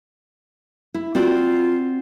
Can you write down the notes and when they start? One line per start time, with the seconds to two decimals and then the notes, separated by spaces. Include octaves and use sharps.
0.94 E4
1.15 C4 F4 F#4 D5